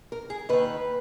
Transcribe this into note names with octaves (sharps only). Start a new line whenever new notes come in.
A#4
G#4
D#2 D#3 B4